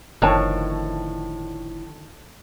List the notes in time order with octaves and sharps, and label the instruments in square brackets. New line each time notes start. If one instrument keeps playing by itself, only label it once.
[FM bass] F#1 [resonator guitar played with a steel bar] A2 [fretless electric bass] D3 D#3 F3 [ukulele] C#5 A5